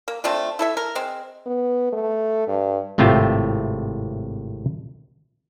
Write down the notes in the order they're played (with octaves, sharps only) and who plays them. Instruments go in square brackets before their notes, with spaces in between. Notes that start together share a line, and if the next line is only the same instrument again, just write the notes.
[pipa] A#3
A3 C4 D4 F4
E4 A4 E5
A#4
G#3 C4
[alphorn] B3
A3
G2
[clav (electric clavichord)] G#1 A2 C3 F4 E5 G5